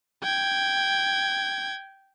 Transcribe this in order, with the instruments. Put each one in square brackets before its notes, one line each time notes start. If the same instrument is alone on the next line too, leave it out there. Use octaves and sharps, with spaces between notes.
[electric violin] G5 G#6